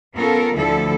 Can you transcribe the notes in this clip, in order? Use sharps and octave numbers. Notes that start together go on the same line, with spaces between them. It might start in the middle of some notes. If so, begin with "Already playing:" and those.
B3 C#4 F4 A4 A#4
D2 D3 F3 E4 A4